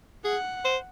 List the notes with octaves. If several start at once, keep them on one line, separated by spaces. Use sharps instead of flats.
G#4 F#5
C5